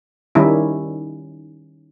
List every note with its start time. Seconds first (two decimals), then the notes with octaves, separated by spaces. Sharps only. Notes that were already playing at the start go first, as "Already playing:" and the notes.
0.35 D#3 G3 C#4 D#4 E4